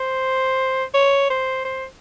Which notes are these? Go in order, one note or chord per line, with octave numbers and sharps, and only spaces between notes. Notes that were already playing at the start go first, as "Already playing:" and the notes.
Already playing: C5
C#5
C5
C5